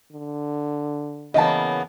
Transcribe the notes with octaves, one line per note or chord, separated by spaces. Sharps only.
D3
C#3 E3 A#3 B3 D#5 A5